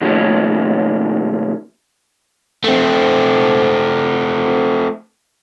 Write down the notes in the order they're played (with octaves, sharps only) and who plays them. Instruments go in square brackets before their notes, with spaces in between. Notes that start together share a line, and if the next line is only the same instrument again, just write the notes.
[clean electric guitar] B2 D#3 F3 A3 A#3 C#4
[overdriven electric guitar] A3 C4